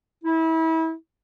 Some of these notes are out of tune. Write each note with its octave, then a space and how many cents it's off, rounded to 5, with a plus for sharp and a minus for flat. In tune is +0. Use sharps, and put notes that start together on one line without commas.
E4 -30